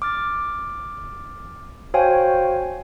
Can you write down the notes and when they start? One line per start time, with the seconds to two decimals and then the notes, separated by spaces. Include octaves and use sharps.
0.02 D6 F6 A6
1.94 F#4 C5 C#5 F5 G5 G#5